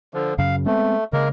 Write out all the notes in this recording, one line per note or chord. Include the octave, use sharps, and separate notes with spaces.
D3 F3
F#2 C#3 F5
G#3 A3 B3 C4
C#3 G#3 A#3 A#4